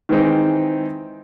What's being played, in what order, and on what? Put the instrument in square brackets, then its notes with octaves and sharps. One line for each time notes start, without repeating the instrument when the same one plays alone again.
[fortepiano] D#3 E3 G#3 C4 D#4